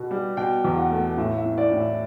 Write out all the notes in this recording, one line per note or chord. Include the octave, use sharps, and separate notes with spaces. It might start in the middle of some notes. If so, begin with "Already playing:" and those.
Already playing: B2 B3
G3
B2 G5
E2
F#5
A3
A2 E5
E5
E3
D5
A2
E5